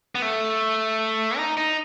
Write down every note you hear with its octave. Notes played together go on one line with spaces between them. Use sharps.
B3
A3
D#4
D#4